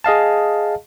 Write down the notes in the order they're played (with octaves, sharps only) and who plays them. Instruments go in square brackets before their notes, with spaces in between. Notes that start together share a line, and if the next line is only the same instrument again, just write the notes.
[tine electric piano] G#4 D#5 F5 A5